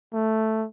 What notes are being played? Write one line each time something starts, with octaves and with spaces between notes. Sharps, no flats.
A3